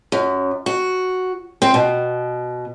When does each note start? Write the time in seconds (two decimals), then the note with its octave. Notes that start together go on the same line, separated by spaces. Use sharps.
0.12 F#2
0.66 F#4
1.62 C4
1.74 B2